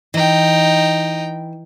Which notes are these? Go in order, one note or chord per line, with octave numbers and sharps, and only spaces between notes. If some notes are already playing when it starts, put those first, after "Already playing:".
E3 D#4 G5